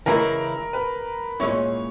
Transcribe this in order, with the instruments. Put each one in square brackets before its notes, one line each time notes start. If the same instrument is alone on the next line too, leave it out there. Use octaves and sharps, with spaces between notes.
[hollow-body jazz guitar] C#3 E3 G#3 C#4 E4 [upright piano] A#4
[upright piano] B4
[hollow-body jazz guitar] A#2 G#3 C#4 E4 [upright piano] C#5